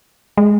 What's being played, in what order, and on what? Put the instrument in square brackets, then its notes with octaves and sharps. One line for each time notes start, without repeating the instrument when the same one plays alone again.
[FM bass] G#3